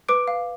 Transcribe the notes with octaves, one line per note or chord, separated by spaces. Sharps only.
B4 D6 D7
F5